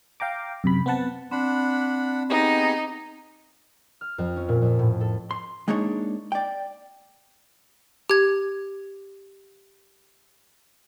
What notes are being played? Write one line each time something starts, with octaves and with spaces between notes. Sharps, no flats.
F5 G5 A#5 D6
F#2 C3 B5
B3 C4 B4 F#5 A5
C4 D4 F#5 B5
B3 D#4 G4 G#4
F6
F2
C#4
A#2
F2
A2
A4
C6
G#3 A#3 D4 D#4 C#5
D5 G5
G4 G#6